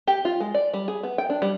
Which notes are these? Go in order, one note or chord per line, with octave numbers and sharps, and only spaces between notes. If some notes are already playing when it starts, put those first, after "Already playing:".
G4
F4
G#3
D5
G3
G#4
B3
G5
D4
G3